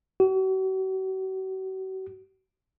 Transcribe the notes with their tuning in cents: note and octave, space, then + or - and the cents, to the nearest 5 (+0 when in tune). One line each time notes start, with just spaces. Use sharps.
F#4 +40